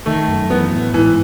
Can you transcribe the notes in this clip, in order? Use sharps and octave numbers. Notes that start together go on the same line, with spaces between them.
D#3 A3
F#2
E3 B3
A2
G#2 E3